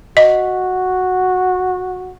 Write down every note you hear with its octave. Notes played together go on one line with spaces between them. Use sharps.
F#4 D#5